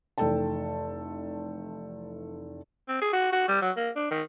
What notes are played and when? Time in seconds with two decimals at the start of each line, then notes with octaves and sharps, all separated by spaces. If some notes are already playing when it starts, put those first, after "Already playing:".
0.18 F1 E3 A4 G5 A5
2.88 C4
3.01 G#4
3.13 F#4
3.32 F#4
3.48 G3
3.62 F#3
3.77 A#3
3.96 D4
4.11 D#3